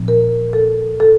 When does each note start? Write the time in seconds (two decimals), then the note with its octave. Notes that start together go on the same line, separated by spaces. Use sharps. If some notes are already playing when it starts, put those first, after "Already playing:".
Already playing: A#2 F3 C4 D#4
0.08 A#4
0.53 A4
1.00 A4